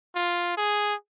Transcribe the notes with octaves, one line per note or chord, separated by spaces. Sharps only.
F4
G#4